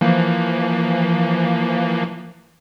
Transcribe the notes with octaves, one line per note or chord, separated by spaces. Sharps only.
E3 F3 A#3